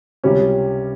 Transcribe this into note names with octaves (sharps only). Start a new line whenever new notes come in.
C#2 C3 G3 C#4